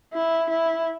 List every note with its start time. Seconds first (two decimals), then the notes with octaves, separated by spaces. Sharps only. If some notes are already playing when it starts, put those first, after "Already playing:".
0.14 E4
0.50 E4